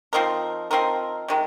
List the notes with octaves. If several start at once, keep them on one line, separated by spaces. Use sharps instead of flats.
F3 C4 D#4 A#4
F3 C4 D#4 A#4
C3 D#3 G#3